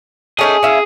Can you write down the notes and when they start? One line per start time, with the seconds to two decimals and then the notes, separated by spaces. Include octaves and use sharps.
0.39 A3 C#4 D#4 G#4
0.63 C#4 E4 F5